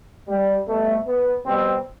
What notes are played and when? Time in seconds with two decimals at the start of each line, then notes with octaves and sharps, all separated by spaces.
0.28 G3
0.67 B2 G3 A3
1.07 B3
1.46 B2 G3 C4